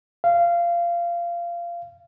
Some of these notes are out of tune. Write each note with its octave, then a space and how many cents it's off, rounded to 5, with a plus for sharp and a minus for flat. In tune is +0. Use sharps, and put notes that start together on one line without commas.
F5 -20